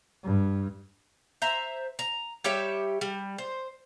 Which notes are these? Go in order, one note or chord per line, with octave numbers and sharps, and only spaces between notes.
G2
C5 E5 A#5
A#5
G3 G4 C#5 E5
G3
C5